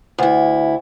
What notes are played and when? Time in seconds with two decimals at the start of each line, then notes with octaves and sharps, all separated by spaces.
0.18 D2 E4